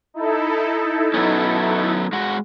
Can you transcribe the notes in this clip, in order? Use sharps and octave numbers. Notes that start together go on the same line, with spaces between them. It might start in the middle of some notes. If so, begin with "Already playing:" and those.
D#4 E4 A4
F#3 B3 C#4
G#3 F#4